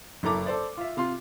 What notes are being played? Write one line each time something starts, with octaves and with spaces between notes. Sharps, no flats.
F#1 E4 A4 A#5 D6
A4 C5 D5
F4 E5
C3 F4 C6